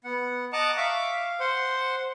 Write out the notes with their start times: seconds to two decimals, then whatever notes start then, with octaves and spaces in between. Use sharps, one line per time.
0.04 B3 F#5
0.53 D#5 F#5 A5 A#5 D6 F#6
0.77 E5 F5 C#6 D6
1.12 F5
1.40 C5 F#5 C6